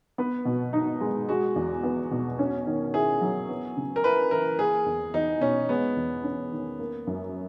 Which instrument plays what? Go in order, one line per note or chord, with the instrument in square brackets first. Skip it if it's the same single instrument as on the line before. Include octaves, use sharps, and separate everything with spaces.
[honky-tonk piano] B3 [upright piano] B4
[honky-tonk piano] B2
D#4
G#3
[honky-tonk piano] G#3 [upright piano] F#4
[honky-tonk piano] E2
B3
B2
C#4
D#3
[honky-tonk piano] E4 [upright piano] G#4
[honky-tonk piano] F#3
B3
C#3
[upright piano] A#4
[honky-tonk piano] E4 [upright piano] B4
[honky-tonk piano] E3 [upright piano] A#4
[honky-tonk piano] A#3 [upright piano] G#4
[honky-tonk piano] E2
[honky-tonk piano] E2 [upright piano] D#4
[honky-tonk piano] B2 [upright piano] C#4
[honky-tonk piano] G#3 [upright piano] B3
[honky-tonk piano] E2
C#4
D#3
A#3
F#2